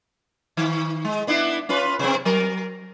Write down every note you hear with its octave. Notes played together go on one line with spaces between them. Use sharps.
D#3
G#3
B3 D4 E4
C#4 F4 B4
C3 C4
F#3 A#4